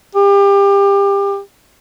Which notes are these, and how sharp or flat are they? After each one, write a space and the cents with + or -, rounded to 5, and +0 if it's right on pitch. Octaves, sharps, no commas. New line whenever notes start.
G4 +30